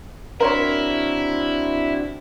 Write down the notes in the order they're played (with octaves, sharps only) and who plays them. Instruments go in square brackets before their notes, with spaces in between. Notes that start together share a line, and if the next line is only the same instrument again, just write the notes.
[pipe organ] C4 D4 F#4 [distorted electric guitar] E4 [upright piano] A#4 C5 C#5